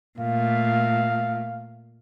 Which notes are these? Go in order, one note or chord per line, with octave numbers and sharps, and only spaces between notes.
A#2 A3 F5